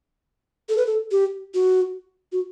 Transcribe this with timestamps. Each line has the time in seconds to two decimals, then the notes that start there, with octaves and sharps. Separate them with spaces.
0.69 A4
0.77 B4
0.87 A4
1.11 G4
1.54 F#4
2.32 F#4